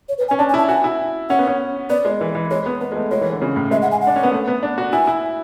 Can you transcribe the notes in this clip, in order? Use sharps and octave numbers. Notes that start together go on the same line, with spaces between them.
C#5
B4
G#5
C#4
D4 A5
G#5
E4
A5
F#4 G#5
E4
C#4 F#5
B3
C#4
B3 D5
G#3
E3
E3
G#3 C#5
B3
B3 B4
G#3
A3
G#3 C#5
E3
D3
C#3
A2
G#3 E5
F#5
G#5
F#5
D4
C#4
B3
A3
B3
D4
F#4
E4 G#5
E4